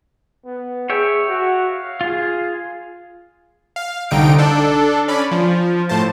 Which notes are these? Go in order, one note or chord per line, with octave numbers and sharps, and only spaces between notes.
B3
G#4 C#5 E5 G5
F#4
F5
F4 G#4
F5
C2 D3 D#4 G5 D7
D4 A4
C#4 D5 B5
F3
A2 C5 A5